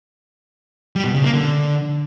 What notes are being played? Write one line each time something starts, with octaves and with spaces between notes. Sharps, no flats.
G3
B2
C#3
A#3
D3